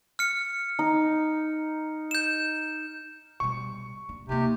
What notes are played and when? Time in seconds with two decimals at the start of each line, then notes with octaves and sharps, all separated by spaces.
0.19 F6 C#7
0.79 D#4
2.11 G6 E7
3.40 B2 G3 C#6
4.09 D4
4.29 C3 A#3 D#4